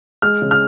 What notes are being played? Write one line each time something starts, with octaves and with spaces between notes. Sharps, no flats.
G#3 F6
C#3
F6